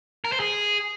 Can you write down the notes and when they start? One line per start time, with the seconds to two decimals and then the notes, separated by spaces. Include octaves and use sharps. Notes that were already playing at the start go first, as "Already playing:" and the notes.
0.25 A#4
0.32 C5
0.40 G#4